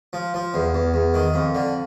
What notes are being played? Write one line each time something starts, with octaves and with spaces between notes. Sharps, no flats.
F3
F3
E2
E2
E2
D#3
F2
D3